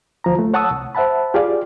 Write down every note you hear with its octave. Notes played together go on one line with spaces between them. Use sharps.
D2 F3 A#5
A3
C#5 F#5 A5 C#6 D#6 E6
C2
C5 E5 F#5 A5 B5
F4 G4 G#4 D5 F5